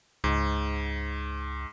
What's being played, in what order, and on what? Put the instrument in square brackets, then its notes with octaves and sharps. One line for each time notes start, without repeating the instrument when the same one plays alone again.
[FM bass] C#2 [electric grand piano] G#2